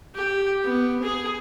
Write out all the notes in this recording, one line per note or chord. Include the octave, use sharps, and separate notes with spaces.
G4
B3
G#4